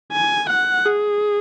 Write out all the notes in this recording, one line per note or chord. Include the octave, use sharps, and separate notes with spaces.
G#5
F#5
G#4